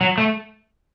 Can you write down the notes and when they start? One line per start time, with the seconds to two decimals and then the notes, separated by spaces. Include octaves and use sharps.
0.01 F#3
0.18 A3